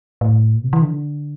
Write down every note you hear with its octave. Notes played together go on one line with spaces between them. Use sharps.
A2
A#2
C3
E3
D3